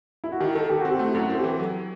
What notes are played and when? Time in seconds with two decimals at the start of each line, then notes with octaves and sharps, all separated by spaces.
0.24 E4
0.32 F#4
0.40 D#3 G4
0.55 D#3 A4
0.69 D#3 G4
0.80 F#4
0.85 C4 G4
0.99 A3 F#4
1.07 E4
1.15 F#2 F#4
1.29 C4 A4
1.39 G4
1.44 E3 A4
1.59 F#3